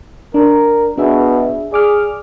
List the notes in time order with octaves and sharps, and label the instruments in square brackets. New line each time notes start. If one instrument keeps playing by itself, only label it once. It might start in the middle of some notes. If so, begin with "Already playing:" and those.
[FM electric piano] D4 [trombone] A#4
[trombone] B2 [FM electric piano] D4 G#4 E5
[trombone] G#4 [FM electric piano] D5 D6 F6